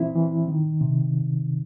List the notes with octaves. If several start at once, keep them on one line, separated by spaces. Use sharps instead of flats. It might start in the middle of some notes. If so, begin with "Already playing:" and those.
Already playing: E3 C4 E4
E3
D#3
C3